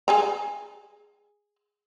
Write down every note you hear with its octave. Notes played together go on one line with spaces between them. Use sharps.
G#4 G#5 A#5